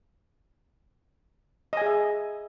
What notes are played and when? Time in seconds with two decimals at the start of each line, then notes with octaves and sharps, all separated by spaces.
1.73 D#5
1.77 G#5
1.82 G#4
1.86 E5